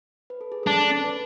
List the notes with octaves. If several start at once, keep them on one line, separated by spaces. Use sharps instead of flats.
B4
A4
G#4
D4 A4
B4